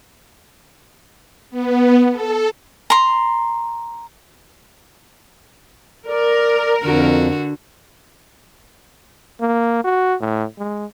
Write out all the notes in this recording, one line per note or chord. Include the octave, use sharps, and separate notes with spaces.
B3
A4
A#5 C6
A#4 D5
F2 D3 F#4
A#3
F#4
A2
G#3